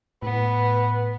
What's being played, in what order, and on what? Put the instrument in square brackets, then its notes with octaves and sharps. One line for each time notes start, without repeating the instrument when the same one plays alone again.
[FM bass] A2 [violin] B3 [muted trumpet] B4